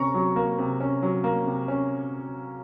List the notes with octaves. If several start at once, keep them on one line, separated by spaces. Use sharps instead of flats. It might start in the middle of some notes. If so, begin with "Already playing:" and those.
Already playing: C3 C#4 A#5 C#6
F#3
A#3
C3
C#4
F#3
A#3
C3
C#4